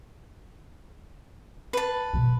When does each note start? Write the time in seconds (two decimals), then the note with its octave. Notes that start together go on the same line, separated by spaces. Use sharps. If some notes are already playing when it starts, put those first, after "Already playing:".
1.73 B4 A5
2.13 B2 G#3